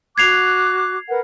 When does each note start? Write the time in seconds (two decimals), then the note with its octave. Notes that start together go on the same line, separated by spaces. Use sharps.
0.18 F#4 D6 F#6 G#6 C7 F7
1.09 A#4 B4 F#5